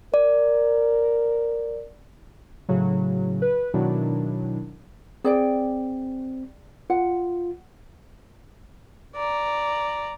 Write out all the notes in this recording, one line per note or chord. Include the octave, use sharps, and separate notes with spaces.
A#4 D5
A2 C#3 F#3
B4
B2 D#3 F#3 D4 E4
C4 G#4 D5 G5
F4 F#5
D5 A#5